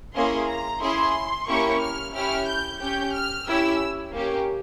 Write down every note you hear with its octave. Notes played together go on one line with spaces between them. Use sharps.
A#3 C#4 E4 G#4 C6
A#5
C#4 E4 G#4 C6
A#3 C#4 E4 G4 C#6
F6
C#4 E4 G4 F6
G6
C#4 G4 G6
F6
C#4 E4 G4 E6
A#3 C#4 G4